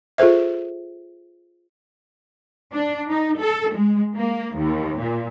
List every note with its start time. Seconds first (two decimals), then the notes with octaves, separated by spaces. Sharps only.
0.18 F4 G#4 A4 C5 E5
2.74 D4
3.09 D#4
3.39 A4
3.73 G#3
4.16 A#3
4.56 D#2
4.98 A#2